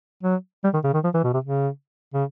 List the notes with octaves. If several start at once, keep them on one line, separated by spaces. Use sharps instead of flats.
F#3
G3
D#3
C#3
D#3
F3
E3
B2
C3
C#3
C#3